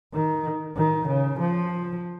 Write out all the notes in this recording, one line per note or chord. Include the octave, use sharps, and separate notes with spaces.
D#3
D#3
C#3
F3